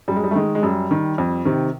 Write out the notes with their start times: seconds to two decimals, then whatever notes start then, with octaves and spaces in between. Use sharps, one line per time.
0.08 F#2 G3
0.16 G#3
0.24 G3
0.31 A3
0.35 D#3 G#3
0.55 G#3
0.63 F#2 G3
0.91 D#3
1.18 F2
1.45 C3 D#3